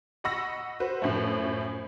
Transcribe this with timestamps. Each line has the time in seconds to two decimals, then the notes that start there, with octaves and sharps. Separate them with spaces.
0.24 D#5 F#5 B5 C#6 E6 A#6
0.80 F#4 B4 C5
1.02 F#2 A2 F3 A3